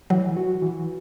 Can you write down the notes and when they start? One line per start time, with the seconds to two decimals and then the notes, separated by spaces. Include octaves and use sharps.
0.10 E3 F#3
0.37 F#4
0.62 E3